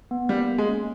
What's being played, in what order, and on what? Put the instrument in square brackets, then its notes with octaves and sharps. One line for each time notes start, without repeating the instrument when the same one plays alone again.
[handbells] B3
[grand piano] G3 [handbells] A#3
[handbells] A#3
[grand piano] G#3
[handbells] C#4